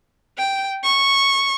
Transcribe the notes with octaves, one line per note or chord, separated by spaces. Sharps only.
G5
C#6